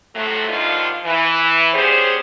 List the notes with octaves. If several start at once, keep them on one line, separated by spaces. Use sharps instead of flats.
A2 C3 F3 F#3 A3
G2 D3 D#3 F3 D#4 F4
E3
B3 C#4 D4 G4 G#4 C5